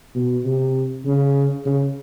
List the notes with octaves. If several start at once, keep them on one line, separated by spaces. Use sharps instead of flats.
B2
C3
C#3
C#3